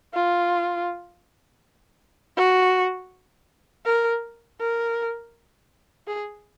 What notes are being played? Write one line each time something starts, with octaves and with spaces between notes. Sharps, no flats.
F4
F#4
A#4
A#4
G#4